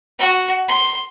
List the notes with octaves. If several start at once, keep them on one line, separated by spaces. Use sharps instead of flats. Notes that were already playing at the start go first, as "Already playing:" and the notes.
F#4
C6